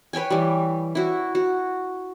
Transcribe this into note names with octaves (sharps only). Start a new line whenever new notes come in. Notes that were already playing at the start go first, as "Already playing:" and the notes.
B4 C#5 G5 G#5
E3 G3
E4 F#4
F#4